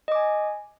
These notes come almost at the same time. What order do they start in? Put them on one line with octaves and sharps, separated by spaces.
D#5 D6 G#5